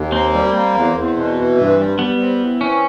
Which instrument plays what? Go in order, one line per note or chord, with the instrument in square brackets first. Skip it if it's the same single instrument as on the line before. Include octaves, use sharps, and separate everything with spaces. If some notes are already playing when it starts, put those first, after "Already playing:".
Already playing: [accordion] D#2
[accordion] A#3 [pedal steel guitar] C4
[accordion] G3
A#3
E2
E2
B2
E3
G2
G3
[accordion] G3 [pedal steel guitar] B3
[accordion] C4
E3
[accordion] C4 [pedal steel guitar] C#4